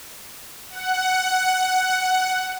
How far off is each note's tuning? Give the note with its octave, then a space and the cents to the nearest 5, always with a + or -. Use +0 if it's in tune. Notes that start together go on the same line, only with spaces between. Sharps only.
F#5 +10